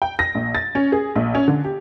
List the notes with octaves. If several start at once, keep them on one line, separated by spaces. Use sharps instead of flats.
G5
A#6
A#1
A6
C#4
G#4
A#1
C#4
D3
G4